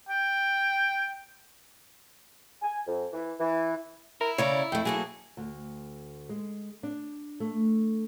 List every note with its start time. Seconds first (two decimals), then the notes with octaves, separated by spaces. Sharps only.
0.09 G5
2.62 G#5
2.86 F2
3.11 E3
3.38 E3
4.21 E4 A#4
4.38 C#3 C#5 D5 A#5
4.72 F2 A3 G5
4.85 F#3 A#3 G#4 A4
5.37 D2
6.29 G#3
6.83 D4
7.40 A3